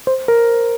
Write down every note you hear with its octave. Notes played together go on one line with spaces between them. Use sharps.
C5
A#4